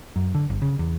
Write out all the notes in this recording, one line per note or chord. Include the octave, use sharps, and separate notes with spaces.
F#2
D3
G1
C#3
E2